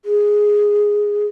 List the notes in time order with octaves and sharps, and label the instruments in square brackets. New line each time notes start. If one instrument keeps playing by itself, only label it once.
[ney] G#4